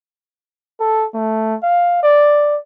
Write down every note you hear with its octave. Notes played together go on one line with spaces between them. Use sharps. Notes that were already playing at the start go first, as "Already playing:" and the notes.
A4
A3
F5
D5